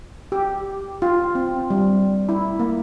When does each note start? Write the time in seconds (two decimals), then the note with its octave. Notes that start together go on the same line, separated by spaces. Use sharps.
0.32 G4
1.02 F4
1.35 C4
1.70 G3
2.29 E4
2.59 A#3